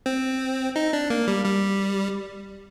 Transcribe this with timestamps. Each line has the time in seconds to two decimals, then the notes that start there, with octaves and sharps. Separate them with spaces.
0.06 C4
0.76 D#4
0.93 D4
1.10 A#3
1.27 G3
1.45 G3